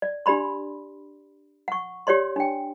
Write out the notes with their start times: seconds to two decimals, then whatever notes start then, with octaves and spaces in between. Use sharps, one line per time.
0.02 D5
0.26 D4 G4 D5 B5 C6
1.68 F#5 C#6
2.07 G4 C#5 D5 C6
2.36 D4 G5